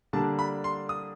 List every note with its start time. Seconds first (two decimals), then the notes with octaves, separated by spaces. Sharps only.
0.13 D3 G3 A#3 D4 A5
0.39 B5
0.64 C6
0.89 D#6